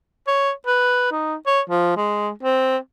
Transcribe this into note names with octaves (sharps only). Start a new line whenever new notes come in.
C#5
B4
D#4
C#5
F3
G#3
C4